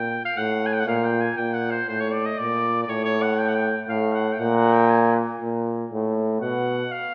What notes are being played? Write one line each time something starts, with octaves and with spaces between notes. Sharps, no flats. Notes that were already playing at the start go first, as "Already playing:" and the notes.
Already playing: A#2 G5
F5
A2 F#5
G#5
G5
F#5
A#2 F5
G5
G#5
A#2 G5
F#5
C5
A2 C5
C#5
D5
D#5
A#2 D5
D5
A2 C#5
C#5
F#5
G5
F#5
G5
A2 F5
F#5
G5
A#2 F#5
F#5
G5
G#5
A#2
A2
B2 F#5
F5